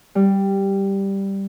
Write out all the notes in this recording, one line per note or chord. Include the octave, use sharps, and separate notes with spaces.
G3